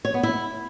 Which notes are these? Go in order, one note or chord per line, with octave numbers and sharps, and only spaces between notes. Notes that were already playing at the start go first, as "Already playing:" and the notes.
C#5
B3
E4